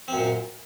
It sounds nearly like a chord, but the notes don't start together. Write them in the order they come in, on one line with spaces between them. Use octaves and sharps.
C4 F#2 A#2